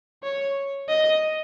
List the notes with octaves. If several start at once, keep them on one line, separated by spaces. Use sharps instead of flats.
C#5
D#5